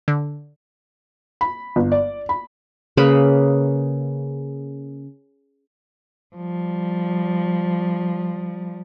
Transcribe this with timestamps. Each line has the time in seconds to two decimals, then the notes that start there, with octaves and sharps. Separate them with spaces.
0.08 D3
1.41 B5
1.76 G1
1.92 D5
2.29 B5
2.97 C#3 A#3 B4 B5
6.36 F3 G3